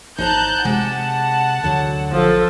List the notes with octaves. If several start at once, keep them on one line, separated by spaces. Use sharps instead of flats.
G#1 D#4 C5 A5 A#5 F#6 G6
C3 G#3 G4 F#5 A5
D2 D3 F#3
A1 F3 A4